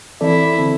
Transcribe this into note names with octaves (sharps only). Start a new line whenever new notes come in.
E3 C4 E4 A4 D5
D3 C4 A4